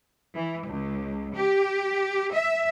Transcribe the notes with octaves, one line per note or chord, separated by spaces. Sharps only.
E3
C#2
G4
E5